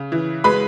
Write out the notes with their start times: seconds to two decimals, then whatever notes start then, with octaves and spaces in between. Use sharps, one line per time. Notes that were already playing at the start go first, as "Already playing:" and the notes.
Already playing: C#3
0.12 E3
0.44 G#3 B4 B5